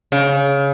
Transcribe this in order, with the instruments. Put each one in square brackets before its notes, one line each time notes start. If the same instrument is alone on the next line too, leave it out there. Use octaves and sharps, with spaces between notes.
[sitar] C#3